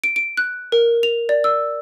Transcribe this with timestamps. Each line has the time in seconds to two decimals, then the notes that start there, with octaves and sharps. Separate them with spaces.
0.04 D7
0.16 D7
0.37 F#6
0.72 A#4
1.03 F7
1.29 D5
1.44 E6